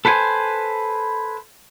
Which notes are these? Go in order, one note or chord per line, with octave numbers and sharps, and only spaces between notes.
A4 B4 C5 F#5 G#5